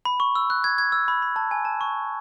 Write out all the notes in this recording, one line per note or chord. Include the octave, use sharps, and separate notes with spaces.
B5
C#6
E6
F#6
G#6
G#6
E6
B5
B5
A5
G#5
A5
C#6